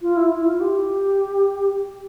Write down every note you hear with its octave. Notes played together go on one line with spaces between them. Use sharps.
F4
E4
E4
F4
G4